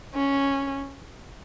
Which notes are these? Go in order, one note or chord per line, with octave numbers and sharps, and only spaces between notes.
C#4